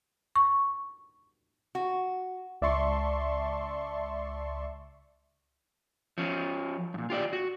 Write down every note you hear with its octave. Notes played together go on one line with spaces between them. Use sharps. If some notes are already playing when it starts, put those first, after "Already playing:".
C#6
F#4
C#2 D5 E5 A5 C6 C#6
F3 C#4
F2 A#2
F4 G4 C#5 D5
F#4